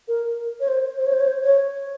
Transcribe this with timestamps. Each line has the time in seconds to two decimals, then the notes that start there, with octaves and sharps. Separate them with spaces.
0.08 A#4
0.60 C#5
0.68 C5
0.98 C5
1.06 C#5
1.13 C5
1.20 C#5
1.27 C5
1.44 C#5